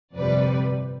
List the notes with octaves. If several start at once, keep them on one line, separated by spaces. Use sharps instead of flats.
G1 F2 C3 G3 B4 D5